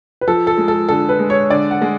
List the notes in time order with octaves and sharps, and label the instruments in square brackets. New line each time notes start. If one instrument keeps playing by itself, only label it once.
[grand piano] B4
[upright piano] F3 [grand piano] A4
[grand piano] A4
[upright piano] G#3
[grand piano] A4
[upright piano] D3 [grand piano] A4
[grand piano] B4
[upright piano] G#3
[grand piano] C#5
[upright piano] D3 [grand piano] D5
[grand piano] F#5
[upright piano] G#3